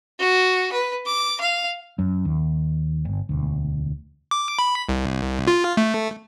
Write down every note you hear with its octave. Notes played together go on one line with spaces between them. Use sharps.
F#4
B4
D6
F5
F#2
D#2
G1
E1 D2
D6
B5
C2
F4
A3